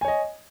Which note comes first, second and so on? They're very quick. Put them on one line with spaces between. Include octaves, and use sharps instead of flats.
G#5 C#5 D#5